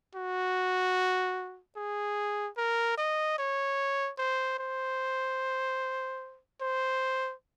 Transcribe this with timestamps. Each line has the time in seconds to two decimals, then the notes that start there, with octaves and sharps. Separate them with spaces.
0.15 F#4
1.76 G#4
2.57 A#4
2.98 D#5
3.38 C#5
4.18 C5
4.58 C5
6.61 C5